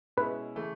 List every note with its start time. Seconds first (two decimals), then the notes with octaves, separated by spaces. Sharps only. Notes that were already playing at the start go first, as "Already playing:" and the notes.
0.17 B2 G#3 C#4 E4 B4
0.56 C#3 E3 A3